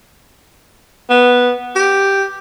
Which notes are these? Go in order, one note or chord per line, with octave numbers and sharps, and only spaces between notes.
B3
G4